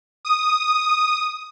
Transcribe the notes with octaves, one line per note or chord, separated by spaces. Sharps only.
D#6